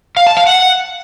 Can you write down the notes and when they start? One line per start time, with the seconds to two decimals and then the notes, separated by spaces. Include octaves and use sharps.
0.17 F5
0.27 A5
0.37 F5
0.47 F#5